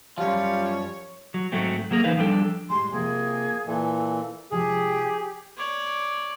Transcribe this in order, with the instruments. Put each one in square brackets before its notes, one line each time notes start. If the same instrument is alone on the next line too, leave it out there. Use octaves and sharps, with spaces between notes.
[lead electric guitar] F#2 F3 [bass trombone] G3 [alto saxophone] F4 [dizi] C#5
[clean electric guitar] F#3
G#2 F#3 A3 C4
F#3 A#3 G#4 A#4
E3 A#3 D#4 B4 C5 F5
F3 G3 D4 A4
[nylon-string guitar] A2 G3 G#3 [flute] C6
[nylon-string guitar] C3 F3 [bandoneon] A#3 [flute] G#4
[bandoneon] A#2 E3 [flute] A4 [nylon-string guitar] E5
[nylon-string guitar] C3 F3 G#3 [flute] G4 [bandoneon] G#4
[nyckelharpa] C#5 D5